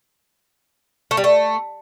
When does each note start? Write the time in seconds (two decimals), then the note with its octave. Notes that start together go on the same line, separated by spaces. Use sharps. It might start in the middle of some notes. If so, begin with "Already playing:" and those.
1.11 A3
1.17 G3
1.24 A3